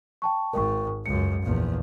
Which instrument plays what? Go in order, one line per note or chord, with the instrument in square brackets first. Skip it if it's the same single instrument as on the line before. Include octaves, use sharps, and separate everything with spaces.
[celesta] G5 A5 C#6
[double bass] G#1 G#2 [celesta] A#4 G5 C#6
[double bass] C#2 F#2 [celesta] C#7
[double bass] A#1 E2